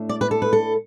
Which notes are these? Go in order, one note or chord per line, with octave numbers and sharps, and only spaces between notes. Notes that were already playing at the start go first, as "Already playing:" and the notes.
Already playing: A2 A3 D4
D5
B4
A4
B4
A4